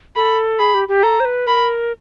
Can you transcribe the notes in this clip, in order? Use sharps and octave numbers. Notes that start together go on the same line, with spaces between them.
A4 B5
G#4 B5
G4
G4
A4 A#5
C5
B4
A#4 B5